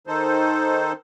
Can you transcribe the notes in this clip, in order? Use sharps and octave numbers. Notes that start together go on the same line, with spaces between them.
D#3 D#4 A4 C5